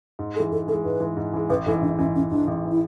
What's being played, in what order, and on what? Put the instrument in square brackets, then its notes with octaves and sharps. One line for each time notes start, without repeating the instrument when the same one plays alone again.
[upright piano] G#2
[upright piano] G#3 [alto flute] A4
[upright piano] E3
[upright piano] G#2 [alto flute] A4
[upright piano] E3 [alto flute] A4
[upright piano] G#3
[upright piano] G#2 [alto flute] B4
[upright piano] E3 G#3
G#2
E3 G#3
[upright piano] A1 [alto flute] B4
[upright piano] G#2 E3 [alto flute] A4
[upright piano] A1 [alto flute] D4
[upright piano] G#2 E3 [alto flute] C#4
[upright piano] A1 [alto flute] C#4
[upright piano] G#2 E3 [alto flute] D4
[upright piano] A1
E3
[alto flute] E4